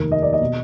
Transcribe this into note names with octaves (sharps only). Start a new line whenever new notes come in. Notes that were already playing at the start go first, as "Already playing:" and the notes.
Already playing: F1 D#2 D#3 A#4
D#5
D5
D#5
B2